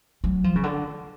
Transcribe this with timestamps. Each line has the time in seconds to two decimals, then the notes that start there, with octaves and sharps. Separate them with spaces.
0.24 F#3
0.44 F3
0.55 C#3
0.63 D3